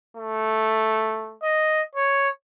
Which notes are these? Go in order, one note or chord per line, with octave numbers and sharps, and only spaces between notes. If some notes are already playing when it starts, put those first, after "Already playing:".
A3
D#5
C#5